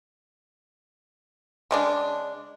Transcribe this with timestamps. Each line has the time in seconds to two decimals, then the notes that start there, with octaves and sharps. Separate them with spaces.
1.71 C#3 G#3 D4